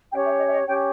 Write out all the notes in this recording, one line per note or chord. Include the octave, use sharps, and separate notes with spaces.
C#4 G4 C#5 G5
E5
D#5
E5
D#5
C#4 G4 C#5 G5